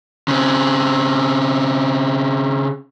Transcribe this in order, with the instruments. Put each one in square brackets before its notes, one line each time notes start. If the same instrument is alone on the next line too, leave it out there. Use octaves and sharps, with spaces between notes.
[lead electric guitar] C#3 C4